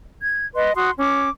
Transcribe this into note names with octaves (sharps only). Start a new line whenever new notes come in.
G#6
B4 D#5 C6
F#4 C6 D#6
C#4 D6